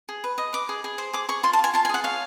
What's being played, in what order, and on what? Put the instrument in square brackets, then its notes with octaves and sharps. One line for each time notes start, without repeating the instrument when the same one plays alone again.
[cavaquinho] G#4
B4
D#5
B4 D6
G#4
G#4
C5
G#4 D6
G#4 C#6
F4 C6
A5
F4 G#5
F4 A5
G#5
G#4 F#5
C#5 F5